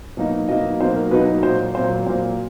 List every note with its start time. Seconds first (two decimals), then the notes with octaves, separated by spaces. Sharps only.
0.17 B2 F#3 A#3 D#4
0.48 B2 F#3 A#3 D#4 D#5
0.80 B2 F#3 A#3 D#4 C5
0.96 A#4
1.11 B2 F#3 A#3 D#4 B4
1.43 A#2 F#3 A#3 C5
1.75 A#2 F#3 A#3 C5
2.07 A#2 F#3 A#3 C5